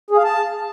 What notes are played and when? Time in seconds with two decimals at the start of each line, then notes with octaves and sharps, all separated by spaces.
0.11 G#4
0.17 F5
0.24 A5